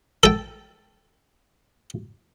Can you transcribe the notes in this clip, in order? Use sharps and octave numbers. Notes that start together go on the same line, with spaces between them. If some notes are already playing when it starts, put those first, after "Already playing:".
A4 G5